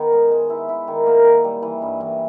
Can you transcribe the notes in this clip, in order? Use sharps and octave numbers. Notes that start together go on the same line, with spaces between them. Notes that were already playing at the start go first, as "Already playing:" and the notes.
Already playing: D#3 B3
G#3
G#3
E4
E4
D#3
A#3
D#3
G3
E3
G2
E3